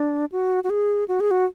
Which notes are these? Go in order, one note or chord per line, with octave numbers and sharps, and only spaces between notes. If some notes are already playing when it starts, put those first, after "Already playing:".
Already playing: D4
F#4
F#4
G#4
F#4
G#4
F#4